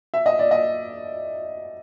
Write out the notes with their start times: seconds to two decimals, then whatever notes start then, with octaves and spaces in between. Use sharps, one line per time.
0.14 E5
0.26 D#5
0.39 D5
0.51 D#5